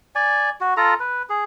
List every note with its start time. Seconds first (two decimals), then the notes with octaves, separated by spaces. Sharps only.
0.15 D5 G#5
0.61 F#4
0.77 F4 A4 A#5
1.00 B4
1.29 G#4